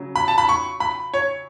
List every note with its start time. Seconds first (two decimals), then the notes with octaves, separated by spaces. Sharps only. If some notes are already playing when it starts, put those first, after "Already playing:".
Already playing: C#3 F#3
0.16 B5
0.28 A5
0.38 B5
0.49 C#6
0.80 B5
1.14 C#5